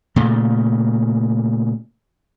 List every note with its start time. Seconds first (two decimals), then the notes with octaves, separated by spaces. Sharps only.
0.16 A#2 C#3 A3